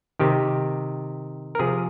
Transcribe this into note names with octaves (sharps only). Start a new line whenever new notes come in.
C3 D#3 G4
A#4
C3 F3 G#4